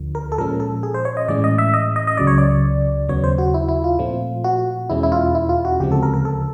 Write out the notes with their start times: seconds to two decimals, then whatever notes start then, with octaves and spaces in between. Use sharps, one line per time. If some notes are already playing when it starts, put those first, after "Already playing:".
Already playing: D2 D3 F3
0.15 A#4
0.32 A4
0.38 A#2 F3 G#3 C#4 A#4
0.60 A4
0.83 G#4
0.94 C5
1.05 C#5
1.17 D#5
1.28 A2 E3 G#3 C#4 D5
1.44 D#5
1.58 E5
1.74 D#5
1.96 D#5
2.07 D#5
2.17 C#2 C#3 F#3 D5
2.27 C#5
2.38 D5
3.09 D#2 C#3 F#3 B3 C#5
3.24 C5
3.38 F#4
3.54 E4
3.69 E4
3.84 F4
3.99 A#2 F3 A3 C4
4.44 F#4
4.90 E2 B2 G#3 C#4 E4
5.03 E4
5.12 F4
5.35 E4
5.49 F4
5.65 F#4
5.80 D2 C#3 F3 G#3 C4 G4
5.92 A4
6.03 A#4
6.14 A#4
6.25 A4